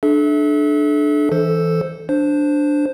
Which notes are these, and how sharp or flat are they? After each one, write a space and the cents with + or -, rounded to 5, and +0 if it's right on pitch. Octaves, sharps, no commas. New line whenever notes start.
D4 +15 A4 -35 E5 -25
E3 +0 A4 +0 C5 +0
D4 +0 C5 +0